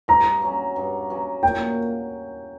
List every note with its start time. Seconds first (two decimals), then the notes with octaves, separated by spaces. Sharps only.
0.08 G2 A#5
0.42 F#3 C#4
0.76 G2
1.10 F#3 C#4
1.43 A#2 G5